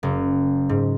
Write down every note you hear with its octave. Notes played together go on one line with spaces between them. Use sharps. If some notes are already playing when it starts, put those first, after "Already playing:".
F#1
G#2